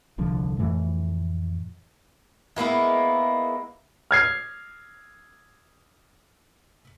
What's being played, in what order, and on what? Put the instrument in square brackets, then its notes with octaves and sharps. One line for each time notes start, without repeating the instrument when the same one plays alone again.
[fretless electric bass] D#1 C2 D3 F3
F2 A2 E3 A3
[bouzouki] G#3 A#3 B3 E4
[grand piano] F6 G#6 C7